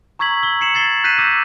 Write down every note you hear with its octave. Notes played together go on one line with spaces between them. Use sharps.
A#5 C#6 E6 G#6 B6 F#7
E6 G7
E6 C7 C#7 E7 F#7
G#6 A6 C7 G7
F#6 G6 B6 C7 D#7 E7
D6 E6 G6 A#6